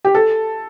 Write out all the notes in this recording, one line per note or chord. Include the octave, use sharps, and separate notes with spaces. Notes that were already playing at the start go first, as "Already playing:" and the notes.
G4
A4